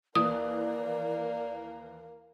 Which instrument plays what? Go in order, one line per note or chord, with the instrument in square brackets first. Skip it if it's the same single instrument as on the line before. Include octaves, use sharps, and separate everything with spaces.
[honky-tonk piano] D#2 E3 [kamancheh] A#3 A#4 [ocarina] D5 [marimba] D#6